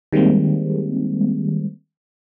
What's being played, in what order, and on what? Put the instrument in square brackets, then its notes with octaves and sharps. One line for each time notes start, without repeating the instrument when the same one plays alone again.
[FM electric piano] D#3 G3 G#3 A#3 C4